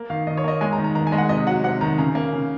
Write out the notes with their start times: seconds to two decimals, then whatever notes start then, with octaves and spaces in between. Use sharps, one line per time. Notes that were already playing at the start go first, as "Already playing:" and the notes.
Already playing: A#3
0.10 D#3 F5
0.27 D#3 D#5
0.37 C#5
0.44 A#3 D#5
0.61 G#3 G#5
0.73 A#5
0.78 D#3
0.84 A#5
0.95 D#3 A#5
1.07 G#5
1.12 G#3
1.18 F#5
1.29 C3 D#5
1.47 F#3 F#5
1.64 C3 F#5
1.81 D#3 A#5
1.98 C#3 A#5
2.15 A#3
2.32 C#3